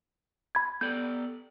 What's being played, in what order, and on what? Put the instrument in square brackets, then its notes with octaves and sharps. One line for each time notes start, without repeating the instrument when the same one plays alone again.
[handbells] B5 G#6
[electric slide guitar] B3 A4 D5 [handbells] G6